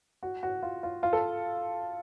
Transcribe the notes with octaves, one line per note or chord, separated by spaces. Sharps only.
F#4
F#4
F4
F4
F4
A4